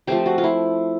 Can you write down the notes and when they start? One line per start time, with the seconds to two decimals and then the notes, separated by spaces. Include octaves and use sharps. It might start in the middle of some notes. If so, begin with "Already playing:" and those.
0.07 F3 A3 C4 G4
0.26 F#4
0.38 F4
0.44 E4